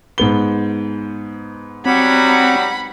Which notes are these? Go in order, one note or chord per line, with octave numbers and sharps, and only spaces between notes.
G#2 B3 G7
F#3 G3 C4 F#5 B5